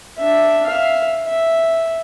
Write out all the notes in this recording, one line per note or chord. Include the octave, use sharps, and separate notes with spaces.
D4 E5
E5 F5
E5